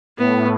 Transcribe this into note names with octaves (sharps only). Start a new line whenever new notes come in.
A2 B3